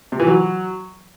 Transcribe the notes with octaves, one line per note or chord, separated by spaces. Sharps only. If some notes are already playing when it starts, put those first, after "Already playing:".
C3
E3
F#3